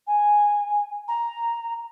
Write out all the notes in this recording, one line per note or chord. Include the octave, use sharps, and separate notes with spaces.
G#5
A#5